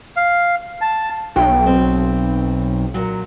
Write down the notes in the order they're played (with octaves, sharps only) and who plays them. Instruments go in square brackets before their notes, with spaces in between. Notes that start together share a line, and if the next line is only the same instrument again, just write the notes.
[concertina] F5
A5
[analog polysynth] B1 [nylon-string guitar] G5
[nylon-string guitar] C4
A#2 F#3